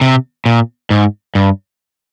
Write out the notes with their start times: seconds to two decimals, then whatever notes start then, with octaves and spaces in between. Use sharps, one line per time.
0.01 C3
0.46 A#2
0.90 G#2
1.35 G2